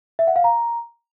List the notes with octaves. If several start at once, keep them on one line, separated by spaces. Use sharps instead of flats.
E5
F#5
F5
A#5